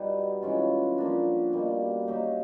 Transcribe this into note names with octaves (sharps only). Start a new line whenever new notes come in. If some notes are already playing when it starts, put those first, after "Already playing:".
Already playing: B2 G3 B3 D#4
E3 G#3 C#4 F4
F3 A#3 D4 F#4
B2 G3 A#3
F#3 A#3 D#4 G4